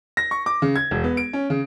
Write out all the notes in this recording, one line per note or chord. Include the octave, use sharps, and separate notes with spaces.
A#6
C#6
D6
C#3
G#6
E1
B3
D7
C#4
C#3